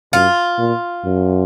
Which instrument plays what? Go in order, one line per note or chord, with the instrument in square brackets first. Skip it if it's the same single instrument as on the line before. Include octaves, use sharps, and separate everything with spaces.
[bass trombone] F#2 [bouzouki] F4
[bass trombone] A#2
F#2